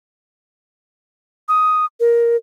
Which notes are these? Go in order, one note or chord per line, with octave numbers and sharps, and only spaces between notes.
D#6
A#4